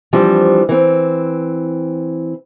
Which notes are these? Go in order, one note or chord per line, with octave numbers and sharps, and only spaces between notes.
E3 F3 G3 C4 D4
E3 C4